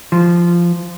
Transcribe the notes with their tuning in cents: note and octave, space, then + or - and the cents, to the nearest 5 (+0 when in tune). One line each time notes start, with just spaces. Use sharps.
F3 -10